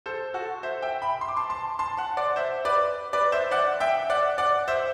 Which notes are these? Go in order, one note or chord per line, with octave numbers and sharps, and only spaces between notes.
A4 C5
F#4 A4
C5 E5
E5 G5
G5 B5
C6
D6
A5 C6
A5 C6
A5 C6
F#5 A5
D5 F#5
C5 E5
B4 D5
B4 D5
C5 E5
D5 F#5
E5 G5
D5 F#5
D5 F#5
C5 E5